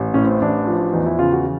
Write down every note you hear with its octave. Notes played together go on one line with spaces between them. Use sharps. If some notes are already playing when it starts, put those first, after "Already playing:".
Already playing: A1
A2 C#4
C4
A1 D4
F3
E2 D#4
E4
C#3 F4
F#4